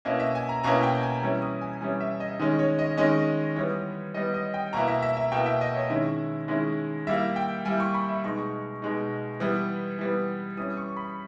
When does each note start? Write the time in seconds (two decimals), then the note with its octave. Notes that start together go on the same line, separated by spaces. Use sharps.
0.05 B2 A#3 C#4 E4 D#5
0.20 E5
0.35 G#5
0.49 A#5
0.63 B2 A#3 C#4 E4 A#5
0.83 G5
1.03 G#5
1.22 E3 G3 C#4 E4 A#5
1.42 D#6
1.61 G#5
1.81 E3 G3 C#4 E4 G#5
2.01 E5
2.20 D#5
2.39 D#3 G#3 C#4 D#5
2.59 C#5
2.79 D#5
2.97 D#3 G#3 C#4 D#5
3.56 E3 G3 B3 C#5
4.14 E3 G3 B3 D#5
4.34 D#5
4.54 G5
4.73 B2 A#3 E4 A#5
4.88 E5
5.02 E5
5.17 E5
5.32 B2 A#3 E4 G5
5.46 E5
5.61 D#5
5.75 C#5
5.90 D#3 G#3 C#4 E4 E5
6.48 D#3 G#3 C#4 E4
7.07 G3 A#3 E4 E5
7.36 G5
7.65 G3 A#3 E4 G#5
7.80 C#6
7.94 B5
8.09 E5
8.23 B2 G#3 D#4 C#6
8.82 B2 G#3 D#4
9.40 E3 G3 B3
9.99 E3 G3 B3
10.57 E3 G3 C#4 D#6
10.77 C#6
10.97 B5